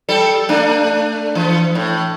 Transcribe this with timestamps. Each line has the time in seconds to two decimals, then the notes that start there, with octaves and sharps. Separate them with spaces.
0.09 G3 A4
0.49 A3 D4
1.35 E3
1.75 A2